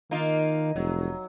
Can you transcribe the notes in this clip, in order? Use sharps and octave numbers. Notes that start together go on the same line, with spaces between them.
D#3 A#3 D#4 F4
F1 F#3